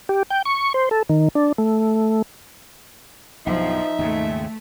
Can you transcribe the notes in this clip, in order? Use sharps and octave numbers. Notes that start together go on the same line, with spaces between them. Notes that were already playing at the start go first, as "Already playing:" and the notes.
G4
G5
C#6
C5
A4
D#3
D4
A3
B1 G2 F3 D#4 E5
D#2 G#2 C#3 A3